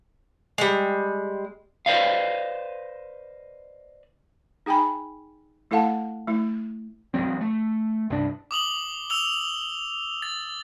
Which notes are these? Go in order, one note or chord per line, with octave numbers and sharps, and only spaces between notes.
G3 G#3
B4 C5 D5 D#5 F5
D#4 G#4 G5 G#5 B5
A3 E4 A4 F5 F#5 A5
A3 E4
E1 D#2 F#3 C4
A3
C2 G2 D4
D6 D#6 F#7 G7
E6 F7 G7
A6